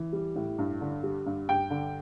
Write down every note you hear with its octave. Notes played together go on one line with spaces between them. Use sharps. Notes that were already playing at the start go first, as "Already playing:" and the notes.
Already playing: E3
G3
A2
G2
D3
G3
G2
G2 G5
D3